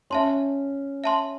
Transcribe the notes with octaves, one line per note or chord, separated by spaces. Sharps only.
C#4 E5 A5 C6
E5 A5 C6